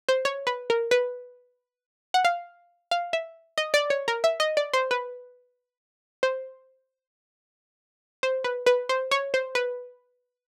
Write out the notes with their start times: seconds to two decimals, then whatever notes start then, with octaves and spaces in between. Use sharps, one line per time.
0.09 C5
0.25 C#5
0.47 B4
0.70 A#4
0.91 B4
2.14 F#5
2.25 F5
2.91 F5
3.13 E5
3.58 D#5
3.74 D5
3.90 C#5
4.08 A#4
4.24 E5
4.40 D#5
4.57 D5
4.73 C5
4.91 B4
6.23 C5
8.23 C5
8.44 B4
8.66 B4
8.89 C5
9.11 C#5
9.34 C5
9.55 B4